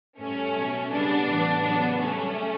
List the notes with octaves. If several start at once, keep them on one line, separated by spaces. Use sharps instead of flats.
A2 G3 A3 C#4
B2 F#3
C#3 G3 B3 D4
A2 E3 G3
C#3 F#3 B3 D4
C#3 G3 A3 C#4